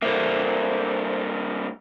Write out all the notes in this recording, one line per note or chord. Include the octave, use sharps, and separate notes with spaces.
G2 A#3 A4 C5 E5